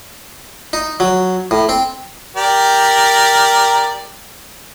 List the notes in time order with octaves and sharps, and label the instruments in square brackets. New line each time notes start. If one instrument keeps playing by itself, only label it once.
[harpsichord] D#4
F#3
A2
C4
[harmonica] G4 A#4 D5